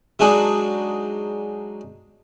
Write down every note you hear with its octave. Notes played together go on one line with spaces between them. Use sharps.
F#3 G#3 D4 D#4 F#4 G#4